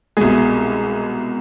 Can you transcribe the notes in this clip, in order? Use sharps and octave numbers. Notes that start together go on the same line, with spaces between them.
C2 B2 G#3 G#4